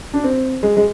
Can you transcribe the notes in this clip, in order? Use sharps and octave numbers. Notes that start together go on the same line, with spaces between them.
D4
C4
G#3
G#3